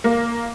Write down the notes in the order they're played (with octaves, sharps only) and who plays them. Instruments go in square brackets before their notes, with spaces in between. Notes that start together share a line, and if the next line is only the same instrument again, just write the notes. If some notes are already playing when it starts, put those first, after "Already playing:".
[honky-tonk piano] A#3